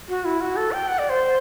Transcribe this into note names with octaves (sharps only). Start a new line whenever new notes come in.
F#4
E4
F#4
A4
G5
F#5
D5
C5